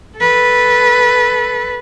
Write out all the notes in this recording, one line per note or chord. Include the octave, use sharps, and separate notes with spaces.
A4 B4